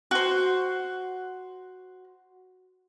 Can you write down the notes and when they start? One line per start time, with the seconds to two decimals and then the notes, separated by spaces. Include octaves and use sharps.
0.11 F#4 C5